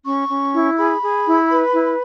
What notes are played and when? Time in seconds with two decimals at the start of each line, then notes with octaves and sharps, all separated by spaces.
0.05 C#4 C#6
0.29 C#4
0.53 E4
0.78 G#4 B5
1.02 G#4
1.26 E4
1.50 B4
1.74 E4